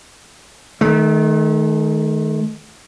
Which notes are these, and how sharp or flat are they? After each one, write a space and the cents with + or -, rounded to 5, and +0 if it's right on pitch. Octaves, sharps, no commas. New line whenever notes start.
D#3 +0 A3 -40